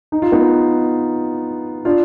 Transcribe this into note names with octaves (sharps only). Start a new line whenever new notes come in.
D#4
F4
B3 D#4
D4 F4